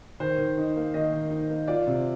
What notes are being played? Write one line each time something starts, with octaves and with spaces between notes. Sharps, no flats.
D#3 C5
D#3
D#4
A#3
D#3 D#5
D#3
D#4
A#3
F4 D5
C3